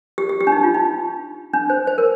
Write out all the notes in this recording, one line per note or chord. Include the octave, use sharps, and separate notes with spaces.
G4
G4
G4
D4
D#4
F4
D#4
D4
C5
C5
A#4